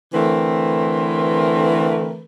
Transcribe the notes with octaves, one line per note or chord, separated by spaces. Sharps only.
D3 E3 A3 C4 A#4 B4